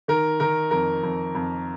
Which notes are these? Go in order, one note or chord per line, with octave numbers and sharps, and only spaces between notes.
D#3 A#4
D#3 A#4
F2 A#4
F2
F2